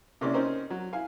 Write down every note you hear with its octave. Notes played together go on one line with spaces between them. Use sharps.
C3 A#3 C#4 E4 D5
C4 C#4 D#4 A#4 C5
F#3
E4 F5 G#5